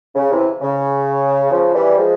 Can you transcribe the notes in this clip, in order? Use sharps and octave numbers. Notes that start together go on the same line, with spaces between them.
C#3
C3 E3
C#3
C#3 F3
E3 G3
F3 G#3